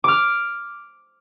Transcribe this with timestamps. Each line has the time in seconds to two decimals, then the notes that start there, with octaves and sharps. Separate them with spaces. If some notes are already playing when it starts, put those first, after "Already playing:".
0.04 D6 F6